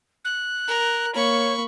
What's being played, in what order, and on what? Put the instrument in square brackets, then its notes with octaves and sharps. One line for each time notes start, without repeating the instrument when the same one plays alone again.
[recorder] F#6
[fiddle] A#4
[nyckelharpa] A#3 [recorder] C#5 [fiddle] B5 C#6